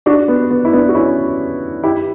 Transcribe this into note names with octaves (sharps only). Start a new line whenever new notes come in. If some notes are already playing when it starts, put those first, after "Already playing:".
D4 F#4
B3
B3
E4
B3 D4
F#4
C#4 E4
E4 G4